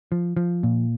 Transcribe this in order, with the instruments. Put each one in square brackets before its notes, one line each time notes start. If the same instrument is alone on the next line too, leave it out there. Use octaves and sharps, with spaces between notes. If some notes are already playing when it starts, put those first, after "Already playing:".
[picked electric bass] F3
F3
A#2